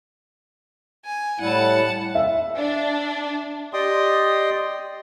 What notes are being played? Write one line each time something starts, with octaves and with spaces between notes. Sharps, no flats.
G#5
A2 G3 E4 F#5 A5
E5
D4
G4 D5 D#5 G5 C6 D#6